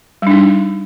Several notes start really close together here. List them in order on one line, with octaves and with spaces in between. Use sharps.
G3 D4 D#4